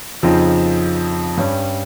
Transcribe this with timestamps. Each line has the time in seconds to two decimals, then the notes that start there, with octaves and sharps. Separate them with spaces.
0.23 F2 C#3 F3 C4 D#4
1.37 G2 G3 C#4